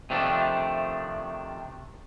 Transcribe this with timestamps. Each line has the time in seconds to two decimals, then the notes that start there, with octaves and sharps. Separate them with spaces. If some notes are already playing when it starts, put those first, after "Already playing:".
0.10 C3 D#3 F3 A3 D4